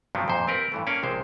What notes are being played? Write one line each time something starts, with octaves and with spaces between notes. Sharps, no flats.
G2 F3 F#3 B3 C4 D4
F2 A#2 C5
C4 G4 A#4 B4
G2 E3 A3
A#3 C#4 D5 F5 G5
A#1 C3 G#3 C5